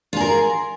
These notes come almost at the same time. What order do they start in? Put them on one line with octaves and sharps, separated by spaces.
F4 G#4 A#4